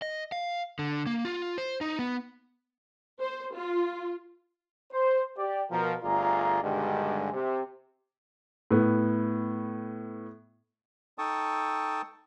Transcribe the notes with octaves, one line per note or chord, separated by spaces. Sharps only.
D#5
F5
D3
A#3
F4
C5
D#4
B3
C5
F4
C5
G4 D5
B2 F3 A#4
G1 A3 F4 G#4 D5 A#5
G2 B2 D3 D#3 G3 G#3
C3
A2 B3
D#4 A4 G5 A5 C#6 D#6